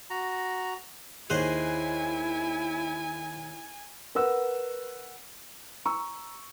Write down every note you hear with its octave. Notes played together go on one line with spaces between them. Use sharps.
F#4 A#5
D#2 E4 G#4 C5 C#5 D#5 G#5 F#6
A#4 B4 F#5 E6
A#5 C#6 E6